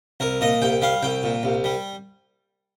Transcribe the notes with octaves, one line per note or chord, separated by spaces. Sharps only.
C2 A#4
A#2 D#5
C2 G5
G3 F5
C2 G5
A#2
C2
G3